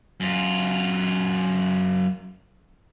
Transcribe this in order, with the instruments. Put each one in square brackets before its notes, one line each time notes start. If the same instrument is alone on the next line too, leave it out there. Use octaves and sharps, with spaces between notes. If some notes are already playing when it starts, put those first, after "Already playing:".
[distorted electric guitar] F#2 F4